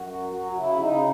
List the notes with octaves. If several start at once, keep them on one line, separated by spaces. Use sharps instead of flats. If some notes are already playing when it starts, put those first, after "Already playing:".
Already playing: F#2 F#4
F#3
F#3
C#3 E4
C#3 D#4